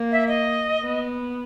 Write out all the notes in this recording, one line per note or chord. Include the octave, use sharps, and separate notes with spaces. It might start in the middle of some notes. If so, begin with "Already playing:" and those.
Already playing: A#3
E5
D#5
B3